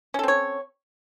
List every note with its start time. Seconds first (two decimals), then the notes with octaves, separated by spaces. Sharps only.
0.14 C#4
0.19 A4
0.23 C4
0.28 C#5